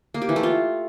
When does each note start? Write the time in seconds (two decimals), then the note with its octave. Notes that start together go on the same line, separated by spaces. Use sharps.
0.14 A#3
0.22 G4
0.29 E3
0.36 A3
0.43 F4